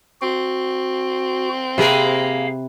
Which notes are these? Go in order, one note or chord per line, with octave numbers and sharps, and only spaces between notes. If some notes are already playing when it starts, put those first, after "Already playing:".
C4 F#4
C3 A#3 G#4 A#4 B4 F5